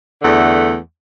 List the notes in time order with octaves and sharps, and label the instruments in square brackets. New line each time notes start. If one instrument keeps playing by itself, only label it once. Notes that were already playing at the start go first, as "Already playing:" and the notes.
[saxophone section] E2 D3 A3 F#5